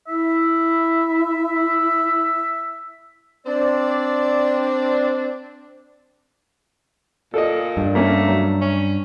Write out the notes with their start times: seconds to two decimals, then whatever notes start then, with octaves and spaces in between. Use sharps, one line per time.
0.08 E4 E5
3.47 C4 D4 D5
7.34 A#2 A4 D#5
7.77 G2
7.95 A3 A#3 C#4
8.28 F#3
8.61 C#4